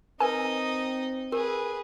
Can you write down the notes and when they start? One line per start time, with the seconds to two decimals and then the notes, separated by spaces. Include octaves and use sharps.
0.20 C4 D#4 A#4 B4 D#5 G#5
1.32 G4 G#4 A#4 B4